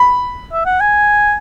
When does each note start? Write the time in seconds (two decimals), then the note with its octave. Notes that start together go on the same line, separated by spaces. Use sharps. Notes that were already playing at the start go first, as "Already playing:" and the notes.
Already playing: B5
0.53 E5
0.66 F#5
0.81 G#5